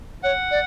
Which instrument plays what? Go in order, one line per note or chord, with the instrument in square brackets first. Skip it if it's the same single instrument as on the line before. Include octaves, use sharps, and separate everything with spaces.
[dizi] C#5 [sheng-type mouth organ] F#5
[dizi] D5